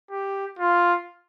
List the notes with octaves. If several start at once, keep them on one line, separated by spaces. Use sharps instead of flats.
G4
F4